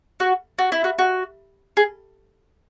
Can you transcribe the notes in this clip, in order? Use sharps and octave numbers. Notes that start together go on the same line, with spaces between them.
F#4
F#4
E4
F#4
F#4
G#4